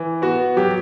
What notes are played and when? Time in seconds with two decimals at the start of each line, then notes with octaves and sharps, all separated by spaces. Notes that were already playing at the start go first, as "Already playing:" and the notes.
Already playing: E3
0.22 B3 F#4
0.57 F#3 G4